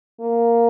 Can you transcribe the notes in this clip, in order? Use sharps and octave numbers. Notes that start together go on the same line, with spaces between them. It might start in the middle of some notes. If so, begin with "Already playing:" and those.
A#3